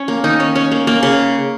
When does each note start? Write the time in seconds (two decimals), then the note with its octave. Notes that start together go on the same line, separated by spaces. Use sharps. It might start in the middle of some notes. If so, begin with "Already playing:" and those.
Already playing: C#4
0.08 A#3
0.24 D#3 D#4
0.40 C#4
0.55 C#4
0.72 A#3
0.87 A#3
1.03 C#3